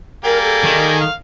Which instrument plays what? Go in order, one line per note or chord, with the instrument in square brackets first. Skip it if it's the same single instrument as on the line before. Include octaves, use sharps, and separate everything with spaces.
[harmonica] G3 A#3 G#4 [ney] A#4
[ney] A4
[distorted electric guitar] D#3
[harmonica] F5